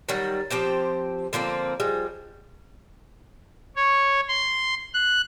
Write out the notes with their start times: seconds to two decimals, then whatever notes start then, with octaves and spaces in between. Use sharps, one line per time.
0.09 D#3 F#3 G3
0.50 F3 C4 G4 C5
1.33 D3 F3 A#3 C4
1.80 F3 G3 G#3
3.76 C#5
4.28 C6
4.94 F#6